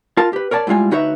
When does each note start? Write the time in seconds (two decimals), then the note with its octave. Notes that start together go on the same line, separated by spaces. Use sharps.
0.17 F4 A#4 F5 A5
0.33 G4 B4
0.51 A#4 C#5 D5 A5
0.67 A2 G3 G#3 F4 G#5
0.91 D2 D#4 F#4 B4 C#5 E5